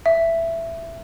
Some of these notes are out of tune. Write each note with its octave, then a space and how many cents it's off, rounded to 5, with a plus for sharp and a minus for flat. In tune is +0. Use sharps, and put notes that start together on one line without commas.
E5 +10